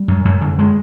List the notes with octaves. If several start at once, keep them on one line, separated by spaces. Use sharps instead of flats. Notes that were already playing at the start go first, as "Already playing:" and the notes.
Already playing: G3
F#2
F#2
D3
G#3